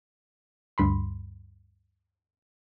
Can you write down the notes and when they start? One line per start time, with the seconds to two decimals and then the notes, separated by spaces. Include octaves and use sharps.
0.78 D2 G2 B5 C6